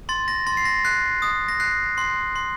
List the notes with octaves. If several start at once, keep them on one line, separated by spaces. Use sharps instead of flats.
C6 A6
A#6
C6 A6
C7
A#6
F#6 C7
D#6
A#6
F#6 C7
C6 C7
C6